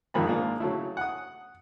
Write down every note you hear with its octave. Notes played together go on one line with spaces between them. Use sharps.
A#1 F2 G#2 D#3 C4 B5
G#2 F3 A#3 D4
C#3 F#3 A3 E4
F#5 D#6